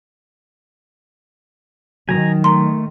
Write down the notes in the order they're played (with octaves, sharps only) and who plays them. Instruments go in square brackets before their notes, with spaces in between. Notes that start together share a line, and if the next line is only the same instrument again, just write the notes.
[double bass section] D#3 [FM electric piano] F#3 [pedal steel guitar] G#5 A#5
[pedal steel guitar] A3 [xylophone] A#5 C6